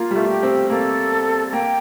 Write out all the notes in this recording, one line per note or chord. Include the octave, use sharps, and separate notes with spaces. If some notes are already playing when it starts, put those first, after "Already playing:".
Already playing: A#3 F4
G3
A3
G4
C4
A#3 A4
A#3 G5